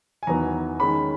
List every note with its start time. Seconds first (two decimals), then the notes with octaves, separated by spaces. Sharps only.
0.23 G#5
0.27 E2 D#3 F#3 B3 A#5
0.80 D#3 G#3 C#4 B5